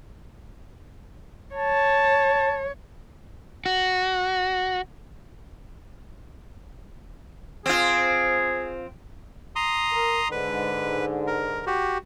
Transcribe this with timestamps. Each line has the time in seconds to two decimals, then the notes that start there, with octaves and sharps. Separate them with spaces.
1.55 C#5 A5
3.66 F#4
7.66 C4 F4 G#4
9.56 A#5 C6 D#6
9.92 A#4
10.32 G#2 D3 B4
11.27 A#4
11.67 F#4 G4